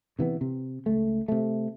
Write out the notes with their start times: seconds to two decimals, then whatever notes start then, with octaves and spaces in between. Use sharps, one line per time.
0.19 C3 E3 A3 B3
0.41 C3
0.86 C#2 A3
1.28 C3 A3